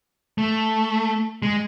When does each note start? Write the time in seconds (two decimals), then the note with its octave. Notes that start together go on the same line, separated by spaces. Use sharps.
0.38 A3
1.42 G#3